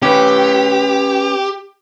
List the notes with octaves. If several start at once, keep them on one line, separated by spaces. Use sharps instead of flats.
C#4 G4 B4